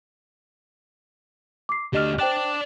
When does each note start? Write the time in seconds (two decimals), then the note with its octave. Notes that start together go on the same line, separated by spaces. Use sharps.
1.69 D6 C7
1.93 D2 D4 G4 D#5 F6
2.19 C5 D5 G5 A5 F#6